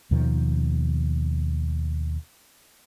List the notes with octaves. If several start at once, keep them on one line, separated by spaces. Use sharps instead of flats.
D#2 B2 D#3 F3